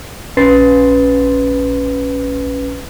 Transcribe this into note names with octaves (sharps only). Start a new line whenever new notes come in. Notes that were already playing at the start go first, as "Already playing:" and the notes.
A#1 C#4 B4 C6 A6 C7